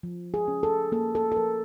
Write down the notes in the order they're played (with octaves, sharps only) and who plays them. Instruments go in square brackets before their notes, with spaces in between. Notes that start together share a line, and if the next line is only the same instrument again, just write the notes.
[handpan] F3
G#4
C#4
A4
A#3 A4
A4
A4
F3 A#4